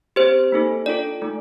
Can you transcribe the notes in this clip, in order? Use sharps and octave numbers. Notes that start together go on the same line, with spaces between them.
C4 G4 C5
A#3 D#4 A4
D4 F4 A4 D5
A3 D#4 A4